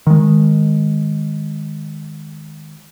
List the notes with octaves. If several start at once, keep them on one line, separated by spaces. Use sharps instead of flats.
D#3 G#3